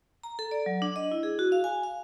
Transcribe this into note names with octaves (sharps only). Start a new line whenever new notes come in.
A#5
A4
D5
F#3
D4
D#5
E4
G#4
F#4
F5
G#5
F5